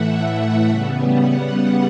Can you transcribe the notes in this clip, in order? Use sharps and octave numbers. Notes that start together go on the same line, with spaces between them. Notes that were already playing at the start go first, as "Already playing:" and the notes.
Already playing: A2 E3 A3 E5 F#5
C#3 G3 B3
F#5
F#5